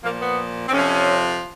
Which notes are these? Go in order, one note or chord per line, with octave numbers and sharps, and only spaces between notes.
A#2 F3 A#3
B3
C4
F2 C3 F3 C#4